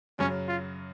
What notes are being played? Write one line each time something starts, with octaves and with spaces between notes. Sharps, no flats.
F#2 C#3 F#3 C#4
F4